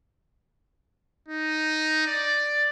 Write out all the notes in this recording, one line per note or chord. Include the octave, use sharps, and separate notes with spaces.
D#4
D5